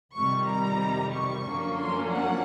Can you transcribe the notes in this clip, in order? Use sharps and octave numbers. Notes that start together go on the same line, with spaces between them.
F2 C3 D#3 G3 C#6
A#5
C#6
F#2 D3 F3 A#3 C#4
C6
F#5